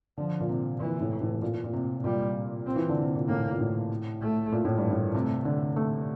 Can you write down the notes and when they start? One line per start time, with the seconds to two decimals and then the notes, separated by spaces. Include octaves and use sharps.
0.18 D3 F3
0.40 A#2
0.49 C3
0.79 A#2 E3
1.00 A2
1.21 A2
1.42 A#2
1.64 A#2
1.73 C3
2.04 A#2 G3
2.67 C4
2.76 E3
2.89 D3
3.02 C3
3.15 A#2
3.28 A2 A#3
3.51 A#2
3.59 A2
4.21 A3
4.52 A#2
4.65 A2
4.78 G2
4.91 A2
5.14 C3 A3
5.45 D3
5.76 A3